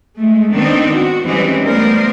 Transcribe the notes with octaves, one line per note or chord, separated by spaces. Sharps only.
G#3 A3
D#3 B3 C4 D4 D#4
F#4
E3 G3 G#3 C4 C#4 D#4
A3 B3 A#4 C5 D5